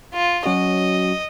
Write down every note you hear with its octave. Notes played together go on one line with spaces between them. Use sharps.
F4
F#3 C#4 F#4 D#5